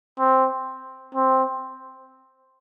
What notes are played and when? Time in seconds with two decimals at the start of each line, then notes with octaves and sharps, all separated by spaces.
0.19 C4
1.15 C4